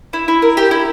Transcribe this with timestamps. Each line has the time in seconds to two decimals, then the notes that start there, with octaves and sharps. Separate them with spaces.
0.13 E4
0.28 E4
0.42 A#4
0.57 G4
0.71 E4